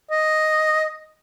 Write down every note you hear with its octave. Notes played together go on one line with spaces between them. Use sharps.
D#5